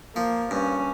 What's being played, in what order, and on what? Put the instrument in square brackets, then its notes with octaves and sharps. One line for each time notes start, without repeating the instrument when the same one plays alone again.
[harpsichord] F3 [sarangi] A#3
[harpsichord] G2 [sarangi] C#4